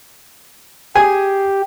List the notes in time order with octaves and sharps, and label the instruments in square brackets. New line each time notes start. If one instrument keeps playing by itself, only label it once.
[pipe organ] G4 [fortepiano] G#4 G#5